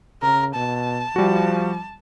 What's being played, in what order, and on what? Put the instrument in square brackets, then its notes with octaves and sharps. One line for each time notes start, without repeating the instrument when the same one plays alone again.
[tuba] C#3 [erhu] A#4
[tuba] B2 [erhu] A5
[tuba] F3 [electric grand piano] G3 F#4